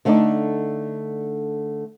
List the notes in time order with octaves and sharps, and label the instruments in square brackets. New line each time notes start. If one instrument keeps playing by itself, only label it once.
[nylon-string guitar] D3 A3 C4 D4 D#4 D5